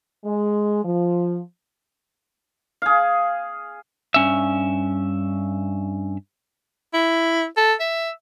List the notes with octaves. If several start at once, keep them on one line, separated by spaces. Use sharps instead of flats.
G#3
F3
G#4 F5
G2 C#4 E5
E4
A4
E5